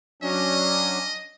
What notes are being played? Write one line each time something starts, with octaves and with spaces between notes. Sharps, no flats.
F#3 C#4 D4 D#5